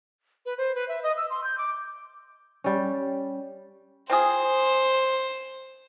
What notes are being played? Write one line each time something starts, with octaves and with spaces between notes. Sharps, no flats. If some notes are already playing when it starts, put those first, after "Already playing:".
B4
C5
B4
E5
D#5
E6
C6
G6
D6
G3 C#4
C4 F4 G#4 C5